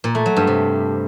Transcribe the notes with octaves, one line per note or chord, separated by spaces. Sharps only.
A#2
A3
F#3
G2
C3